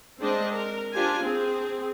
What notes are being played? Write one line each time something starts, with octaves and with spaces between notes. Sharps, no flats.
G#3 C4 D4 C5 D#5
A#4
D4 F4 G4 C5 G#5
C4 G#4